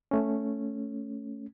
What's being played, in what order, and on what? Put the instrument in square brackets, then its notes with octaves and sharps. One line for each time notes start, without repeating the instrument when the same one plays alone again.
[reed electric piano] A3 C#4